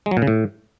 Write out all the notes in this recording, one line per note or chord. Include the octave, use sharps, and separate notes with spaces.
G#3
F#3
A#2
C#3
A2